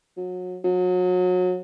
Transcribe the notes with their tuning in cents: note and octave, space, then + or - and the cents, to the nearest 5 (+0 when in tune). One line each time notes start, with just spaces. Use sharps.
F#3 -30
F#3 -30